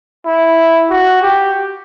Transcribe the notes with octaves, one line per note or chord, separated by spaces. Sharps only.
E4
F#4
G4